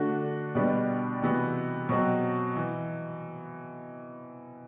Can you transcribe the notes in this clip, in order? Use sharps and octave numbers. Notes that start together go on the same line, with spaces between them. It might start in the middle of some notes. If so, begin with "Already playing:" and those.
Already playing: D3 A3 D4 F#4
B2 G3 B3 D4
C3 E3 B3 F#4
B2 F#3 C4 F#4
E3